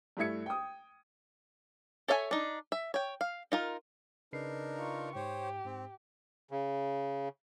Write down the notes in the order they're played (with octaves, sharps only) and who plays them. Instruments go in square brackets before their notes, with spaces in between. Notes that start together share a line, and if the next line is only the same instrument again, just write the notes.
[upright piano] G2 A3 E4 E5 G#6 C#7
G5 D#6
[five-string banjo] A4 C#5 E5 F5 G#5
D4 D#4
E5
C#5 G5
F5
D#4 F4 A#4
[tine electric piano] C#3 B4 C7 [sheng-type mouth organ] D4 D#4 A#4
[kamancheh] F4 C#6
[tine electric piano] G#2 [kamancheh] G4 [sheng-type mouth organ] C5 C#5
[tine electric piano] G#2 [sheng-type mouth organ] C4
[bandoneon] C#3